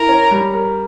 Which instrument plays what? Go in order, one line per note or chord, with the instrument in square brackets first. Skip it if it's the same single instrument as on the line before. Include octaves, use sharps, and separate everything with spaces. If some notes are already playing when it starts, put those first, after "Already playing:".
Already playing: [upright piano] E4 [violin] A#4
[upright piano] C#4
G3
A#4